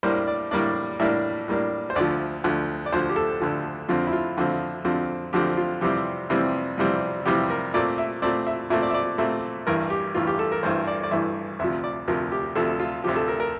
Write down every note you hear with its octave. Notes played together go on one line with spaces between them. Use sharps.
A2 G3 A#3 D4 C5
D5
A2 G3 A#3 D4 D5
A2 G3 A#3 D4 E5
A2 G3 A#3 D4
C5
D2 D3 F3 D5
D2 D3 F3
D5
D2 D3 F3 C5
G4
A4
D2 D3 F3
F2 D3 F3 C4 F4
E4
F4
F2 D3 F3 C4
F2 D3 F3 C4
F2 D3 F3 C4 G4
F4
F2 C3 E3 G3 C4 G4
F2 C3 E3 G3 C4
F2 C3 E3 G3 C4
F2 C3 E3 G3 C4 G4
A#4
A#2 A3 C4 D5
E5
A#2 A3 C4 D5
E5
A#2 A3 C4 E5
D5
E5
D5
A#2 A3 C4 E5
A1 G2 E3 A#4
G4
A1 G2 E3 F4
G4
A4
A#4
A1 G2 E3 C5
D5
D5
A1 G2 E3 E5
D2 C3 F3 E5
D5
D2 C3 F3 A#4
G4
D2 C3 F3 A4
F4
D2 C3 F3 G4
A4
A#4
A#4